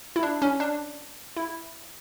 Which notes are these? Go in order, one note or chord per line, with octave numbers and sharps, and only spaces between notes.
E4
D4
C#4
D4
E4